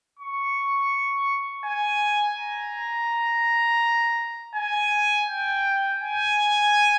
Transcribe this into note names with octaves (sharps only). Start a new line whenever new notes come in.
C#6
G#5
A#5
G#5
G5
G#5